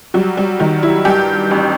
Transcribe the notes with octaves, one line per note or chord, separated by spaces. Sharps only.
F#3 G3
G3
D#3 G3
E4
G2 G4
A1